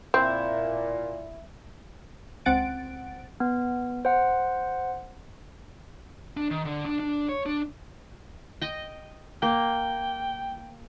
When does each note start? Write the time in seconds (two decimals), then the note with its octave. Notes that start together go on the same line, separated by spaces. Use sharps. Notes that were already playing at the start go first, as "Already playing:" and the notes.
0.14 A#2 C4 E4 G6
2.45 C#2 C4 F#5 A6 D7
3.40 B3
4.05 C5 F#5
6.37 D4
6.51 D#3
6.65 D3
6.85 D4
7.00 D4
7.29 C#5
7.46 D4
8.62 D#5 G5
9.42 A#3 G5